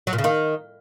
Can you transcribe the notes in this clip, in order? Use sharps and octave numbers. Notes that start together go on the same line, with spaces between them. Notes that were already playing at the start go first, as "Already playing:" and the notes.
F#3
A#2
C#3
D#3